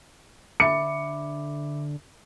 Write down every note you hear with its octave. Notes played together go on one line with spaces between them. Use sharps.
D3 E5 B5 D6 C#7